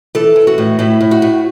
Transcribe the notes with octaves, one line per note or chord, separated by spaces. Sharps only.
E3 A4
E3
F#4
A2
A2 E4
A2
F#4
A2